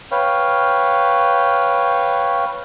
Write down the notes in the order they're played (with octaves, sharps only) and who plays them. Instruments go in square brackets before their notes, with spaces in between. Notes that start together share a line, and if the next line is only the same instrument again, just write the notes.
[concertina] B4 C#5 F5 G5